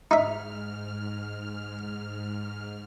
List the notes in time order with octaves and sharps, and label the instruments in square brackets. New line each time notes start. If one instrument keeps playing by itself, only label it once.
[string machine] G#2 F6 [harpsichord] D#4 E5